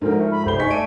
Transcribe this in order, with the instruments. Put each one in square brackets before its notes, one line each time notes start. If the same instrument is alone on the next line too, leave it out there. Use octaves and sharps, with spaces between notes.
[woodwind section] D2 [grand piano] G#2 F3 [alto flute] A#4
[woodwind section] A3
[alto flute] B5
[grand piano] F1 G7 [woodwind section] E2 A2 G3 [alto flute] C5
[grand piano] D#4 B6 [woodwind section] G#5 C#6
[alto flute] A3 [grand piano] D5 D7 D#7